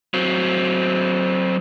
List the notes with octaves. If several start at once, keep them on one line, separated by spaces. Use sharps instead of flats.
F#3 C4